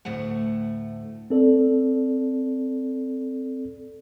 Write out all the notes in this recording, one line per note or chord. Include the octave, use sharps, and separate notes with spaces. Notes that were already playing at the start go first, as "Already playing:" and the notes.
D2 A2 A3 F#5
C4 A4 D5